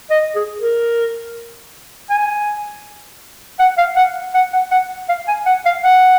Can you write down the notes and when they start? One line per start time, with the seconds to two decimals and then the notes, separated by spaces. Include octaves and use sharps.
0.10 D#5
0.35 G#4
0.60 A#4
2.10 G#5
3.59 F#5
3.78 F5
3.96 F#5
4.34 F#5
4.53 F#5
4.71 F#5
5.09 F5
5.28 G#5
5.46 F#5
5.65 F5
5.83 F#5